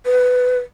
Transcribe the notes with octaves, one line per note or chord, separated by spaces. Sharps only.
B4